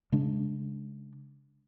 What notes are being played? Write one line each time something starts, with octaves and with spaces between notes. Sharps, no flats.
C#3 G#3 D4